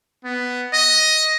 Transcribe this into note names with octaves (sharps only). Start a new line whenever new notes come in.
B3
D#5